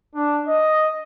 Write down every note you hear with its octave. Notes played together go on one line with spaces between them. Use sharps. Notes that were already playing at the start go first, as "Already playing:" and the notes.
D4
D#5